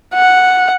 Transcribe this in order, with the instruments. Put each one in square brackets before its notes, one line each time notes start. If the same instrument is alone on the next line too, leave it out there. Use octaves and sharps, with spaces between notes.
[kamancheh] F#5